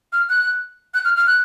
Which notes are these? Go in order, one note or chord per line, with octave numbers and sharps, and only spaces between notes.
F6
F#6
F#6
F6
F6
F#6